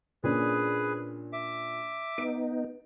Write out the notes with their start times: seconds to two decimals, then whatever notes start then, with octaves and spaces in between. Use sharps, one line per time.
0.24 A#2 C#4 D4 G#4 B4
1.33 E5 D6
2.18 B3 D#4 D7